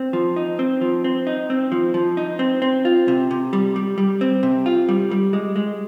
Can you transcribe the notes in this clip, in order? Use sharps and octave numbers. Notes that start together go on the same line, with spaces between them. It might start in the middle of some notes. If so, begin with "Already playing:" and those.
Already playing: C4
F3
D#4
C4
F3
C4
D#4
C4
F3
F3
D#4
C4
C4
F4
C3
C3
G3
G3
G3
C4
C3
F4
G3
G3
G#3
G#3